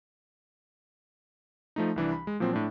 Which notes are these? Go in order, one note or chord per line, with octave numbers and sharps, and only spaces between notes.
F3 A3 D#4
C2 E3 D4
B5
G#3
A#2 F3 F#3 C4
A2 D4